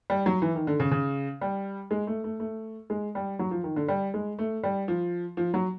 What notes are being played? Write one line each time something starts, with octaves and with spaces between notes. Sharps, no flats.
G3
F#3
E3
D#3
D3
C#3
C#3
G3
G#3
A3
A3
A3
G#3
G3
F#3
F3
D#3
D3
G3
G#3
A3
G3
F3
F3
F#3